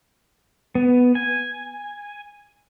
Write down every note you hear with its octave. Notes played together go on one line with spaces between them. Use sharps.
B3
G#5